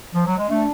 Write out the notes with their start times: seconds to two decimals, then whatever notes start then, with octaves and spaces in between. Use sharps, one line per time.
0.14 F3
0.26 F#3
0.37 G#3
0.49 A3 D4